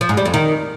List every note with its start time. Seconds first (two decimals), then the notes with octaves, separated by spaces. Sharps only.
0.01 F3
0.09 G#2
0.17 G3
0.25 F2
0.34 D#3